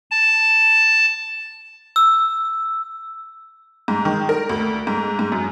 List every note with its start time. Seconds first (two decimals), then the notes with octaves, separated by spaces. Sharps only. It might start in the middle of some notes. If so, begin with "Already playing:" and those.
0.11 A5
1.96 E6
3.88 G#2
4.05 D#3
4.29 A#4
4.49 D2
4.87 G#2
5.19 G#2
5.32 F#2